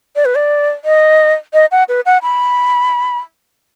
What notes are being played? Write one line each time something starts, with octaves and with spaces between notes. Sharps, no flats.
D5
B4
D5
D#5
D#5
F#5
B4
F#5
B5